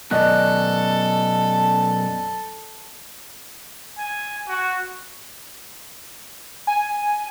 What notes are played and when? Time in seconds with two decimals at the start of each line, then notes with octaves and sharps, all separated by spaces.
0.11 F#2 B2 A4 D5 D#5 F#6
3.98 G#5
4.48 F#4
6.67 G#5